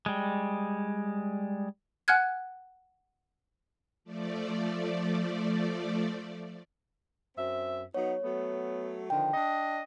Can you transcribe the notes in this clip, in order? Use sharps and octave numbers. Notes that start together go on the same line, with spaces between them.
G3 G#3
F#5 G#5 F6 F#6 G#6
F3 A3 D5
F#2 C4 E5
F#3 B3 D#4 C#5
F#3 A3 B3
D3 D#3 F3 G5
D4 D#5